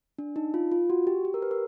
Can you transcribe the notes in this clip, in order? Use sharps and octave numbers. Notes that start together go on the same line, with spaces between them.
D4
D#4
F4
F4
F#4
G4
G4
A#4
B4
A#4